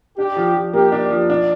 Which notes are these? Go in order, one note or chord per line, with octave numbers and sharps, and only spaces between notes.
D4 G4
F3
F3
A#3 G4
D4
F3
D4